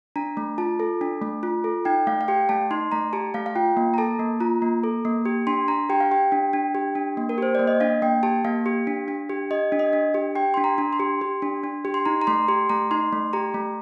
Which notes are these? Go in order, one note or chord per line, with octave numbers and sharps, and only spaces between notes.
D4 A#5
A3
F4 A5
A4
D4
A3
F4
A4
D#4 G5
A3 F5
F5
G4 G5
A3 A5
D#4 C6
A3 A#5
G4 A5
A3 F5
F5
F4 G5
A#3
A#5
A4 A5
A#3
F4 A#5
A#3
A4
A#3
G4
D4 C6
D4 A#5
G4 G5
F5
G4 G5
D4
D4
G4
D4
A#3
A#4
G4 C5
A#3 D5
D#5
D4 F5
A#3 G5
G4 A5
A#3 F5
G4
D4
D4
G4
G4 D#5
D4
D#5
D4
G4
G4 G5
D4 C6
A#5
D4
C6
G4
G4
D4
D4
G4
C6
D#4 A#5
A#5
A3 C6
G4 C6
A3 A#5
D#4 C6
A3
G4 A#5
A3